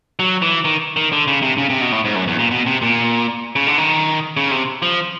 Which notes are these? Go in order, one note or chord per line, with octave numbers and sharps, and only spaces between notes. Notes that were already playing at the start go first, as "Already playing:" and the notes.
F#3
E3
D#3
D#3
D3
C#3
C3
C#3
C3
B2
A2
G#2
F#2
E2
A#2
B2
C3
A#2
C#3
D3
D#3
C#3
C3
F3